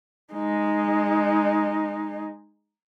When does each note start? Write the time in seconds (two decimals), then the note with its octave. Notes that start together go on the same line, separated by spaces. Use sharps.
0.33 G#3 D#4